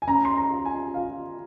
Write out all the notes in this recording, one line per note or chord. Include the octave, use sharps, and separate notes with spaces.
G#5
C#4 A#5
C6
A#5
F4
G#5
F4 F5